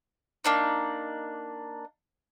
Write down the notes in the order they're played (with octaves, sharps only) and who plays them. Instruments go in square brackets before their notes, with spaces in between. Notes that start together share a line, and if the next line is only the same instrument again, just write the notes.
[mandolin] A#3 D4 D#4